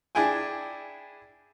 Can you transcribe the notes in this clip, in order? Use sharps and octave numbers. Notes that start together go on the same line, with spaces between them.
D4 E4 G#4 G5 G#5